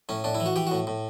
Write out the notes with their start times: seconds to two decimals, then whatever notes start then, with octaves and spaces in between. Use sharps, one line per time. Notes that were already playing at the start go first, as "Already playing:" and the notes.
0.09 A2 C#4
0.24 A2 D4
0.35 E4
0.40 E3
0.46 F#4
0.56 E3 G4
0.67 A2 F#4
0.87 A2